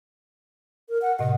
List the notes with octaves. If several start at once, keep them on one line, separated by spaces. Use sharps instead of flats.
A#4
F#5
A2 C3 D#5